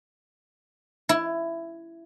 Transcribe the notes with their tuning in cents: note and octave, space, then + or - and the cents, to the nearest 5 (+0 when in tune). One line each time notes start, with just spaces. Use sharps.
E4 +15